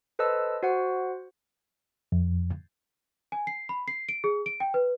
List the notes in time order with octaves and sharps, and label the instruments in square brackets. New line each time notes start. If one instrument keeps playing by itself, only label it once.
[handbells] A4 B4 C5 D#5 A5 E6
F#4 C5 F#5
[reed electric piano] F2
[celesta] G#5
C7
B5
C7
D7
G#4
D7
G5
B4